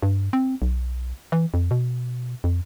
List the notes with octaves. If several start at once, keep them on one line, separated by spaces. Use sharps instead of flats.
G2
C4
B1
E3
F2
B2
F2